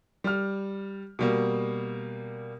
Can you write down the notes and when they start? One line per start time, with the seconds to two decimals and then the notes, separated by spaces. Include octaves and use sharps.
0.24 G3 F6
1.19 B2 G3 A#3